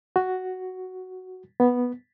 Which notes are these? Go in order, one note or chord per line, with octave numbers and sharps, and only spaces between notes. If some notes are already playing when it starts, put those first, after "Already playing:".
F#4
B3